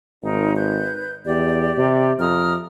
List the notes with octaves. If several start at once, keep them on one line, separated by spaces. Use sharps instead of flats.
G#1 D#4 A#4
B4 G6
E2 G4 D5
C3
F2 A#5 D#6 F6